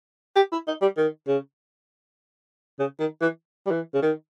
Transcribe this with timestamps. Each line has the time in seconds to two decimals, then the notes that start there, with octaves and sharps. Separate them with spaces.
0.36 G4
0.52 E4
0.68 D#4
0.82 G3
0.97 D#3
1.28 C#3
2.79 C#3
3.00 D#3
3.21 E3
3.66 G3
3.71 E3
3.94 C#3
4.02 D#3